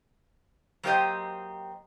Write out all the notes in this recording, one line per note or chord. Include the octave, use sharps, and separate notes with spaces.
F#3 A#3 C4 G4 C5 D#5